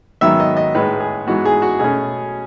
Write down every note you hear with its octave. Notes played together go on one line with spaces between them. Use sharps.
G#2 D#3 F#3 B3 E5
D#5
D#5
A2 G#3 D#4 B4
G#4
G#2 E3 G#3 B3 F#4
G#4
F#4
B2 A3 C#4 G#4